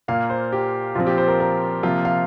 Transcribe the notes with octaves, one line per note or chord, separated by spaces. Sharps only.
A#2 A#3 F5
C5
G4
A#2 F3 C4 F4
G4
C5
A#4
A#4
C3 F3 A#3 F4
F5